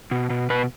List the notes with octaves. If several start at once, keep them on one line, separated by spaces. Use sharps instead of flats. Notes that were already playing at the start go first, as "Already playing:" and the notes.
B2
B2
B2 B4